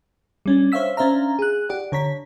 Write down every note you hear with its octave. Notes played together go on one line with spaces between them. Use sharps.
G3 C#4 D4
C5 C#5 E5 F5 E6 B6
C#4 D4 C5 E5 F5 A#5
G#4 F#6
G4 D5 F#5
D3 C#5 A#5 B6